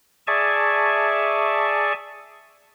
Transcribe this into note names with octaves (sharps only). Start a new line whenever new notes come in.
G#4 D5 E5 G#5 A5 C#6